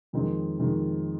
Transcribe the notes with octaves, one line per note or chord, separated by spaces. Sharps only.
F2 D#3 G#3 C4 D#4
F2 D#3 G#3 C4 D#4